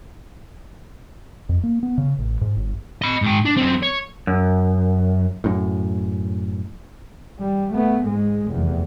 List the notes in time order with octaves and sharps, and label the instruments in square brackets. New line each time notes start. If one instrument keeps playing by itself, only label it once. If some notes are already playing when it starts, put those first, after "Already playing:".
[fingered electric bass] F2
A#3
B3
C#3
A1
G#2
G1
[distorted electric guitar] D#5 B5
G#2 G5
D4
F#2 C4
C#5
[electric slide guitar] F#2
[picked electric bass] F#2 A2
[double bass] G3
A3 B3
G#2 G#3
F1 E2